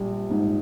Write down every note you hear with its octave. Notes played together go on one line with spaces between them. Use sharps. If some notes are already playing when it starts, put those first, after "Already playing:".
Already playing: A#1 G3
G#2